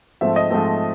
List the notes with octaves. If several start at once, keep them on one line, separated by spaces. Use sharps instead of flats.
G#2 F3 A3 C4 E5
D#5
G#2 F3 A3 C4